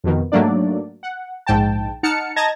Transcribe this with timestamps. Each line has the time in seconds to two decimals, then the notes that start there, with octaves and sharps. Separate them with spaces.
0.04 F2 B2 D#3
0.32 G#2 F#3 A3 A#3 D4 D5
1.03 F#5
1.47 A#1 G#2 G5 A5
2.03 D#4 F#5 A5 F6 C#7
2.36 D#5 A5 A#5 G#6 A#6